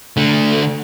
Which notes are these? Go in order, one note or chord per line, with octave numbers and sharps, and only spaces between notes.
D3 A3